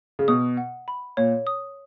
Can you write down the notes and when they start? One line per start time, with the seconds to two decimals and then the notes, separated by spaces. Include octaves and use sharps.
0.19 C#3
0.28 B2 D#6
0.57 F#5
0.88 B5
1.17 A#2 C#5
1.47 D#6